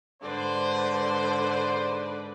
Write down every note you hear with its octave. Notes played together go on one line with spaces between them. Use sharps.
G#2 D3 B4 C5 D5